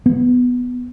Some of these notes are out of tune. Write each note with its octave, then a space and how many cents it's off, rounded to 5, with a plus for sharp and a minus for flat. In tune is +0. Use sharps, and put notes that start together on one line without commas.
B3 +5